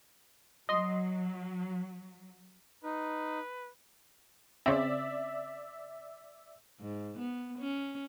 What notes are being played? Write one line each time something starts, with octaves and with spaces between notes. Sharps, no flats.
F#3 D#5 C6
D#4 B4
C#3 C4 D5 E5
G#2
B3
C#4